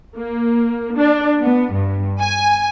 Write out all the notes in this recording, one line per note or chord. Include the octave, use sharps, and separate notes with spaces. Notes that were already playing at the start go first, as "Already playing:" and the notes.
A#3
D4
B3
G2
G#5